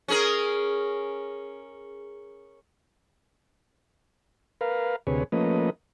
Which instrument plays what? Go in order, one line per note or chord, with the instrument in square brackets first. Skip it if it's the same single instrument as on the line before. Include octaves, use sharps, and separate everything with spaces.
[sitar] C#4 G#4 A#4
[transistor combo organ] A#4 B4 F5
D2 C3 G#4 B4 C#5
F3 A3 A#3 C#4 B4 D#5